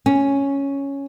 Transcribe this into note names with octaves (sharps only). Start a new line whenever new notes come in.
C#4